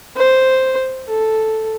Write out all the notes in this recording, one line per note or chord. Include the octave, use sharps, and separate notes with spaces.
C5
A4